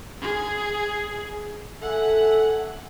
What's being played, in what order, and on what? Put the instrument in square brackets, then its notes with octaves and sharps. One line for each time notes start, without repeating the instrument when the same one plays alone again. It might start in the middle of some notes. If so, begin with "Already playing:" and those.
[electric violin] G#4
[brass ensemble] A4 E5 G#5 [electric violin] F#5